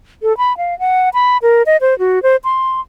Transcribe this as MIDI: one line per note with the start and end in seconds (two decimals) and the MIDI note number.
0.23 0.36 69
0.38 0.56 83
0.57 0.78 77
0.79 1.09 78
1.14 1.37 83
1.42 1.62 70
1.66 1.77 75
1.81 1.98 72
1.99 2.22 66
2.23 2.36 72
2.44 2.80 84